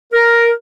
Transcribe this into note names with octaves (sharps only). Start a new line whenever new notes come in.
A#4